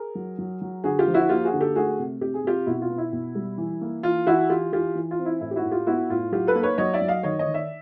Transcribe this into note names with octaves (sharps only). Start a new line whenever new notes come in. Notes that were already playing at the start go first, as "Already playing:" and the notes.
Already playing: G#4 A#4
F#3
F#3
F#3
D3 F#4 G#4
F4 G4
F3
E4 F#4
A#3 F4 G4
F#4 G#4
D3
G4 A4
A3 F#4 G#4
C3
C3 G4
G#4
C3 F4 G4
B2 E4 F#4
F4
B3
E4
B2
G3
E3
A#3
E3 F4
E3 E4 F#4
E3 F4 G4
E3 F4 G4
E3
F4
C4
E4
A2 E4
G4
E4 F#4
A2
F4 G4
B3 E4 F#4
A2 F4
F#3 F4 G4
A4 B4
A#3
B4 C#5
F#3 C#5 D#5
D5 E5
F#3
D#5 F5
D#3 C#5 D#5
C#5 D#5
D#3
D5 E5